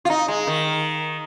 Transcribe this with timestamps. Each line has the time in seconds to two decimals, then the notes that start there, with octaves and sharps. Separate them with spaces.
0.05 F4
0.10 D#4
0.28 G#3
0.47 D#3